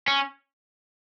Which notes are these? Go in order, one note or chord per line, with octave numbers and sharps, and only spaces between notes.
C#4